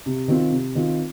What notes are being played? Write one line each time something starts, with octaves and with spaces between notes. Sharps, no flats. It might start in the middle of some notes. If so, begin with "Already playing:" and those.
C3
D#3 C4 F4
C3
D#3 C4 F4